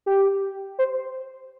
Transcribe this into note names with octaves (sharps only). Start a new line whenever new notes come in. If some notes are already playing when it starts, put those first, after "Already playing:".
G4
C5